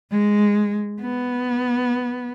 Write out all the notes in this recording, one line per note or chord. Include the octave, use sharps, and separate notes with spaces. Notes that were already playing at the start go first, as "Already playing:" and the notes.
G#3
B3